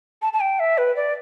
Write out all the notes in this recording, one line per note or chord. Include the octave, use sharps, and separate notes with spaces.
A5
A5
G5
E5
B4
D5